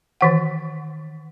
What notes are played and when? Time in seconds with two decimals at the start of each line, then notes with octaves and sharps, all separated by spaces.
0.21 D#3 E3 F#5